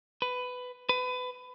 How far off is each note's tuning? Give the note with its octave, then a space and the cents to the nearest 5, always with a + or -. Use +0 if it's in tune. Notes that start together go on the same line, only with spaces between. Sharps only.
B4 +15
B4 +25